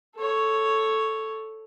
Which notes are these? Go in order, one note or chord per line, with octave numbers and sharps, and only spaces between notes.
A4 C#5